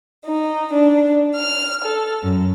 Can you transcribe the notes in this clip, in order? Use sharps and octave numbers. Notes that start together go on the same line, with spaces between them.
D#4
D4
F6
A4
F#2